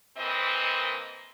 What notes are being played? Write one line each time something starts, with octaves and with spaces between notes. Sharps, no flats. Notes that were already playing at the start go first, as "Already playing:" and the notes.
A#2 E3 C4 D#5